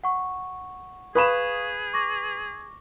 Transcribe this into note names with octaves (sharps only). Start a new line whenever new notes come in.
F#5 C#6
G#4 B4 F5 B5 C#6 D#6 E7
C#6 D6 A#6